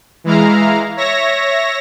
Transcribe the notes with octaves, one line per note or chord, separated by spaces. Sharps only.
E3 G#3 E4 F5 A#5
C#5 E5 A#6